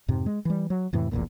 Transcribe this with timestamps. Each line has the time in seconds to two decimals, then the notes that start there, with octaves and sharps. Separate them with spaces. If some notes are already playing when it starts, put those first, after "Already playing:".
0.08 F2 G#2 C3
0.26 G#3
0.45 E3 G3
0.70 F#3
0.93 F2 A2 C3 E3
1.12 F1 B1 E2 A#2